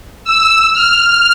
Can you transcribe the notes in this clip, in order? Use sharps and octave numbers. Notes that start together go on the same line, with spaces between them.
E6
F6